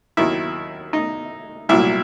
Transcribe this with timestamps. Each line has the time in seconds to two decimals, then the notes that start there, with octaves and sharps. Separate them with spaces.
0.17 D#2 D#3 F#3 E4
0.93 D#4
1.69 C2 A#2 F#3 E4